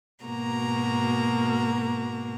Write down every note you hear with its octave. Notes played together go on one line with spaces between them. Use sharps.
G#2 B2 A#3 F#4 A#5